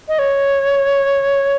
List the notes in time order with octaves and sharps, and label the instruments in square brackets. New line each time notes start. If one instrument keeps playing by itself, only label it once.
[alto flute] D#5
C#5